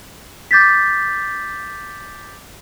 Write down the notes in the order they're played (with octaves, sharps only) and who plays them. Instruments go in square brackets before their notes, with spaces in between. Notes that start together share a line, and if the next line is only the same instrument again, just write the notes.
[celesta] D6 G6 A6 B6